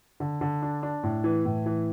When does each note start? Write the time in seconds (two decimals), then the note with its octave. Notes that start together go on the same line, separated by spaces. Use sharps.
0.20 D3
0.41 D3
0.62 D4
0.83 D4
1.03 A2
1.24 E3
1.45 A2
1.66 E3